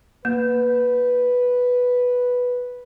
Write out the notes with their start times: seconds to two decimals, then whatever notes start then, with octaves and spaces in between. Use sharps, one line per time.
0.25 A#3 B4